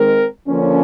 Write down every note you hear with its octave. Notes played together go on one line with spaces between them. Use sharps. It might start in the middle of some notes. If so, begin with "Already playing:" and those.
Already playing: D#3 G#3 C4 A#4
D3 F3 A#3 C#4